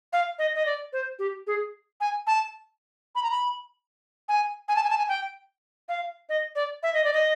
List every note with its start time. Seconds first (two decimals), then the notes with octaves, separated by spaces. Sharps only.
0.13 F5
0.39 D#5
0.55 D#5
0.66 D5
0.93 C5
1.19 G4
1.47 G#4
2.01 G#5
2.27 A5
3.15 B5
3.23 A#5
3.31 B5
4.29 G#5
4.68 G#5
4.76 A5
4.83 G#5
4.90 A5
4.98 G#5
5.09 G5
5.89 F5
6.29 D#5
6.56 D5
6.83 E5
6.94 D#5
7.04 D5
7.13 D#5